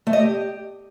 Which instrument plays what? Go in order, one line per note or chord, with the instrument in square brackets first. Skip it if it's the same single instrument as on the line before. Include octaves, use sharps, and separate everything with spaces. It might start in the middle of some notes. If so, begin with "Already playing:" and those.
[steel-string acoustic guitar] A3
D#5
G4